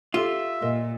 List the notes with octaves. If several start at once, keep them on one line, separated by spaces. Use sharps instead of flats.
F4 G4 A4 E5
A#2 A#4 D#5